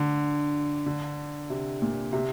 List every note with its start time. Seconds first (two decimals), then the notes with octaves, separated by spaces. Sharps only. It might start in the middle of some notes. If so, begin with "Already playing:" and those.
Already playing: D3
0.86 D3
1.50 C3
1.82 A#2
2.13 C3